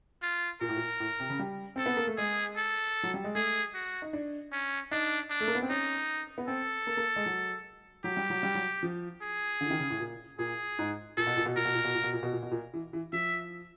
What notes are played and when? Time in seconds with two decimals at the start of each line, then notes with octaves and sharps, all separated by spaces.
0.22 F4
0.61 A#2 A#4
0.69 A2
0.76 A#2
1.00 A2
1.20 C3
1.30 C#3
1.39 G3
1.76 C4 A4
1.86 B3
1.97 A#3
2.07 A3
2.18 G#3 G#4
2.57 A4
3.03 F#3
3.14 G3
3.24 G#3
3.35 A3 G#4
3.74 F#4
4.02 D#4
4.13 D4
4.52 C#4
4.91 D4 D#4
5.30 D4
5.41 A3
5.48 A#3
5.55 B3
5.63 C4
5.70 C#4 D#4
6.38 B3
6.48 C4 A4
6.87 A#3
6.97 A#3
7.16 G#3
7.26 F#3
8.04 F#3 G4
8.17 G3
8.30 F#3
8.43 G3
8.55 F#3
8.83 F3
9.22 G#4
9.61 D3
9.66 E3
9.70 D#3
9.80 C#3
9.90 A2
10.00 A#2
10.39 A#2 G#4
10.79 G#2
11.17 A#2 A4
11.27 B2
11.37 A#2
11.46 B2
11.56 A#2 A#4
11.65 B2
11.74 A#2
11.84 B2
11.94 A#2
12.03 B2
12.13 A#2
12.23 B2
12.32 A#2
12.43 B2
12.51 A#2
12.73 E3
12.93 E3
13.13 F3 E5